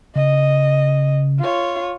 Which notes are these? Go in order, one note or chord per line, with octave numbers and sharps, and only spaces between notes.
C#3 D#5
F4 C#5